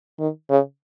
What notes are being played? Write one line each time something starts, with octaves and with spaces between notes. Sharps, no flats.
D#3
C#3